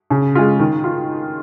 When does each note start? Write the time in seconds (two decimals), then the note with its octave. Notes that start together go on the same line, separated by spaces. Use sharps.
0.10 C#3
0.35 G#3 F4
0.60 D#3
0.84 F4